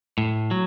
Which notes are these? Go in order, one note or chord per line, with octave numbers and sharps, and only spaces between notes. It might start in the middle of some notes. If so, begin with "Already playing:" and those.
A2
F#3